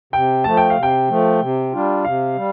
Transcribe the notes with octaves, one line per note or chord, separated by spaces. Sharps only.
C3 G5
F3 A3 A5
G5
F5
C3
G5
F3 A3
C3
G3 D4 F4
C3 F5
G3